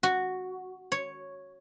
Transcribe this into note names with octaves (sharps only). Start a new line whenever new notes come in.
F#4
C#5